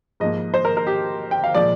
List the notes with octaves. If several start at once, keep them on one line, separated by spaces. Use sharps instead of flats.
G#2 F3 A#3 D#5
C5
A#4
A#4
G4
G5
F5
A#2 F3 G#3 D5